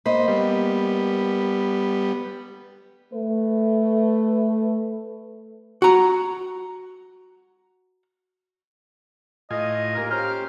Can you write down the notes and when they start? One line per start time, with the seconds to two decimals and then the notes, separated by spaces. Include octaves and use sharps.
0.06 A#3 C5 D#5 B5
0.28 G3 B3
3.14 A3 B4
5.82 F#4 A#5
9.51 A2 F4 D#5 G#5
9.95 D#2 A#3 A#4
10.11 C#4 G4 C5 A#5 F6